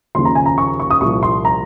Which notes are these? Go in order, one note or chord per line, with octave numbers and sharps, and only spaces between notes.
D#2 C#3 F3 C6
A#5
G#5
A#5
C#6
C#6
D#6
C2 A#2 F3 C#6
C6
A#5